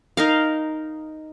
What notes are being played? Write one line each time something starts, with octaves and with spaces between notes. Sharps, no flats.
D#4 A#4 F5